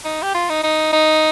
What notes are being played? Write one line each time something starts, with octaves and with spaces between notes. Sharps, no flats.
D#4
G4
F4
D#4
D#4
D#4